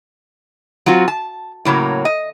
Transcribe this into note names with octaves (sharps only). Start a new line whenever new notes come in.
F#3 C4 F4 F#4
A5
A2 C#3 F#3 A#3
D#5